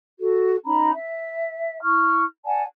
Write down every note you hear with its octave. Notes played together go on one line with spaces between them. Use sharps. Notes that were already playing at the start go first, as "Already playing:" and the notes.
F#4 A4
C#4 D#4 A#5 B5
E5
E4 C#6 F6
D5 F#5 G#5 A5